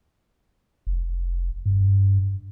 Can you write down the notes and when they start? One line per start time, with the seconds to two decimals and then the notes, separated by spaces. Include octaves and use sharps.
0.87 F1
1.66 G2